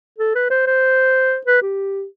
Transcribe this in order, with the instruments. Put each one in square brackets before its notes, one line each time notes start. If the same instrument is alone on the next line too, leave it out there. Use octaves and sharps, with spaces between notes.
[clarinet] A4
B4
C5
C5
B4
G4